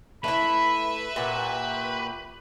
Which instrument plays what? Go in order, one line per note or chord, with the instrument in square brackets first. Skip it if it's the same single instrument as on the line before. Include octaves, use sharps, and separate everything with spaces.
[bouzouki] A3 E4 [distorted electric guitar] B4 [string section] E5 [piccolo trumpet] B5
[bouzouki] A#2 F#4 [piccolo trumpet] G4